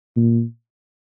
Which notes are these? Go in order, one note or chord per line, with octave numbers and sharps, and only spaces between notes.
A#2